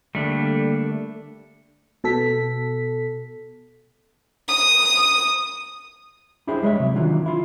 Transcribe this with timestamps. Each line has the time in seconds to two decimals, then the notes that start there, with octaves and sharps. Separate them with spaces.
0.15 D3 G3 A3 A#3 D4 G4
2.04 B2 A4 B6
4.48 D#6
6.47 D4 E4 G4 G#4 C5
6.62 G3 G#3 C5 C#5 E5
6.80 C3 F#3
6.95 D#3 E3 F#3 D4 F4
7.26 E4 F4